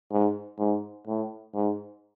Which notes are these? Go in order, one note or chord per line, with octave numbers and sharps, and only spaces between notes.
G#2
G#2
A2
G#2